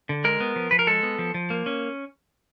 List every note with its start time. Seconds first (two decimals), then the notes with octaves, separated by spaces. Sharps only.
0.09 D3
0.24 G#3 A#4
0.40 B3
0.56 F3
0.71 F3 B4
0.79 A#4
0.87 G#3 A4
1.03 B3
1.19 F3
1.34 F3
1.50 A#3
1.66 C#4